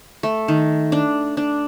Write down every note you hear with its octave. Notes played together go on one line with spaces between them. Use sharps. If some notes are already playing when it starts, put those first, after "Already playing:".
A3
D#3
D4
D4